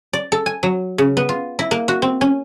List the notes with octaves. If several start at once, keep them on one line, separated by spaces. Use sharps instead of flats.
D5
A4
G#5
F#3
C#3
B3
F4
E4
A#3
F#4
C4
C#4